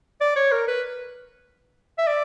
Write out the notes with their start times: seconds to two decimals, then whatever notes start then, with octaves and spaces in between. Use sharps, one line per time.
0.21 D5
0.36 C#5
0.52 A#4
0.68 B4
1.98 E5
2.07 D5